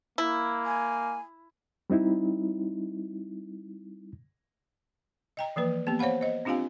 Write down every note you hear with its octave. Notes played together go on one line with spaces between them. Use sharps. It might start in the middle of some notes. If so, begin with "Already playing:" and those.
A#3 E4
G#5
G3 C4 D#4 E4
D#5 G5 A#5
E3 F3 A#3 B4
A#3 B3 G4
C5 C#5 F5 F#5 B5
C5 D#5
C4 D4 F4 G4 F5 G#5